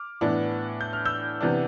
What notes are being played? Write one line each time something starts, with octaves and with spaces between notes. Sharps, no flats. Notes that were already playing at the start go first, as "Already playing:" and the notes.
Already playing: D6 F6
A2 E3 B3 D4
G6
F6
E6 G6
C3 E3 B3 D4